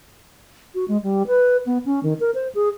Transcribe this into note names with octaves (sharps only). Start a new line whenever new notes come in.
F#4
G#3
G3
B4
B3
C#4
D#3
A#4
C5
G#4